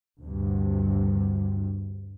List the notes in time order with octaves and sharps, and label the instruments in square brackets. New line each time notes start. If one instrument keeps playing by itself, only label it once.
[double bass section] D2 G2 C3